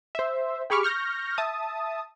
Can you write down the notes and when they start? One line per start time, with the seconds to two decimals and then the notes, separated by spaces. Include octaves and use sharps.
0.15 C5 E5
0.70 G4 G#4 B5 C#6 D6 F6
0.83 C#6 F6 G6 A#6
1.38 E5 A5 D#6